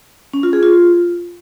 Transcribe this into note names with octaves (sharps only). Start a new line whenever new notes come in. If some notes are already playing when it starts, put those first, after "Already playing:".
C#4
F4
G#4
F4